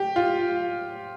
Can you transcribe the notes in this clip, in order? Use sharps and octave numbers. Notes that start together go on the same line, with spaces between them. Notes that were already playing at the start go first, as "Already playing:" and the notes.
Already playing: G4
F4